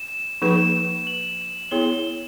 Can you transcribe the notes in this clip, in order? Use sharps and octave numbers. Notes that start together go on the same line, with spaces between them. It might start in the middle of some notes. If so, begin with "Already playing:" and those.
Already playing: E7
F3 A#3 D#4 G#4 B4 E7
F#7
B3 E4 G#4 C#5 G7